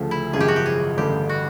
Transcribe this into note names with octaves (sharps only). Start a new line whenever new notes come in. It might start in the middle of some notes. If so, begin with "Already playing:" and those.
Already playing: D2 C#3 F3 A3
E4
G#1 F#2 C#3 F3 G#4
G4
F#4
G4
G#4
A1 G2 D3 G3 G4
F#4